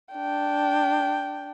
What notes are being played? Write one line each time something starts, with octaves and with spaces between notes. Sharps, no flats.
D4 G5